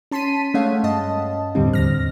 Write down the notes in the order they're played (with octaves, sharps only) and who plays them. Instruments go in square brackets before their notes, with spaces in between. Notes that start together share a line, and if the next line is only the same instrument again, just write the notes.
[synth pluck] C#4 A5 C6 B6 C7 D#7
G#3 A3 C#4 C#5 F5 F#5
G2 D#5 A5
E2 A2 D3 G3 C4
D#2 F6 A#6